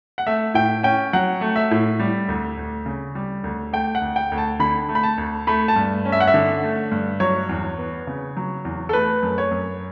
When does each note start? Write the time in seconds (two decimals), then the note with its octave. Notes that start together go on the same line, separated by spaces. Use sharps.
0.18 F#5
0.26 A3 E5
0.54 A2 G5
0.83 C#4 G5
1.13 F#3 F#5
1.41 A3
1.56 E5
1.71 A2
2.00 G3
2.28 D2
2.57 D2
2.86 C#3
3.15 G3
3.44 D2
3.73 A3 G5
3.95 F#5
4.02 D2
4.16 G5
4.32 D2
4.38 A5
4.59 D3 B5
4.89 A3
4.95 B5
5.03 A5
5.18 D2
5.47 A3 B5
5.68 A5
5.76 G2
6.05 C#4
6.12 E5
6.20 F#5
6.27 E5
6.34 D3
6.63 A3
6.91 G2
7.20 F#3 C#5
7.49 E2
7.78 B3
8.07 C#3
8.37 F#3
8.65 E2
8.89 A4
8.93 A3 B4
9.23 F#2
9.38 C#5
9.51 F#2